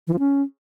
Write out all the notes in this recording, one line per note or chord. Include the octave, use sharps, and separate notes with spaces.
E3
F3
C#4